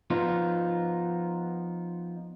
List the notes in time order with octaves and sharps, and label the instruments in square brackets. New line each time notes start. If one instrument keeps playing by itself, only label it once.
[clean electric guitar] F3 B3 D#4 F4